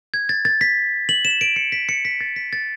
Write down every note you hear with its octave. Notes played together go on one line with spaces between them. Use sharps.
G#6
A6
A6
B6
F#7
E7
D7
C#7
B6
C#7
B6
A6
B6
A6